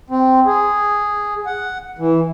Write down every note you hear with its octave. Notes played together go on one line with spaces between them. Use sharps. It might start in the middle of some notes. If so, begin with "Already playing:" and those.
C4
G#4
F#5
E3